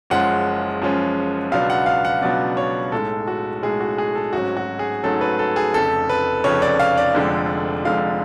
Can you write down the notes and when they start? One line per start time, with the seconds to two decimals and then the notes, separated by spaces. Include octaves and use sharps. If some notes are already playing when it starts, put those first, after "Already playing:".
0.10 F#1 F#2 F3 G#3 C#4 F#5
0.81 F#1 F#2 F3 G#3 C#4
1.51 C#2 B2 F#3 B3 D4 F5
1.70 F#5
1.86 F5
2.05 F#5
2.21 C#2 B2 F#3 B3 D4 D5
2.57 C#5
2.92 B1 A2 G#3 A4
3.27 F#4
3.63 B1 A2 G#3 G#4
3.80 F#4
3.98 G#4
4.15 A4
4.33 G#1 G#2 F#3 A3 C#4 F#4
4.57 F#4
4.79 G#4
5.03 G#1 G#2 F#3 A3 C#4 A4
5.21 B4
5.39 A4
5.56 G#4
5.74 F1 F2 C#3 A4
6.09 B4
6.44 F1 F2 C#3 C#5
6.62 D5
6.80 F5
6.97 D5
7.15 F1 F2 D3 G#3
7.85 F1 F2 D3 G#3 F5